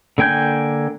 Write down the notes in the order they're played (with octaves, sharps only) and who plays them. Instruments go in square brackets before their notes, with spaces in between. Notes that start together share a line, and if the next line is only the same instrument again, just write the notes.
[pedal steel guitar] D3 A#3 G5 G#5 G6